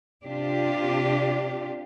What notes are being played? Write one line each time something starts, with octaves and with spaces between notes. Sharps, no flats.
C3 D4 F4 G4